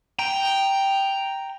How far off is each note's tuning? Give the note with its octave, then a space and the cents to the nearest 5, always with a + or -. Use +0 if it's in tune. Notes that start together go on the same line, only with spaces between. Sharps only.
G5 +0 A#5 +0